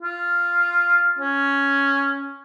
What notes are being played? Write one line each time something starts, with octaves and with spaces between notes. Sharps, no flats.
F4
C#4